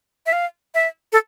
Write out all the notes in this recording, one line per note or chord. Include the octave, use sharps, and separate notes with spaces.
E5
F5
E5
A4